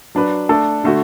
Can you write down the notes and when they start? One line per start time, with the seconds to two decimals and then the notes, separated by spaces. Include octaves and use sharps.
0.15 F#3 D4 B4
0.49 A3 D4 A4
0.84 D3 A3 F#4